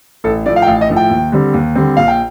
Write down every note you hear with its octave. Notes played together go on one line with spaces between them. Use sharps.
A1 A4
A2 F3 A3 D5
F5
G5
A1 F5
D#5
A2 F3 A3
G5
D#2
D3 G3 C4
D#2
D3 G3 C4
A#1 F5
G5